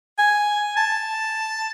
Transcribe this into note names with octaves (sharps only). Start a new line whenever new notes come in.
G#5
A5